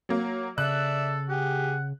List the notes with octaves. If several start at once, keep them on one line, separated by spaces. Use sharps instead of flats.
F#3 A#3
C#3 A4 D5 E5 E6 F#6
G4 G#4 F#5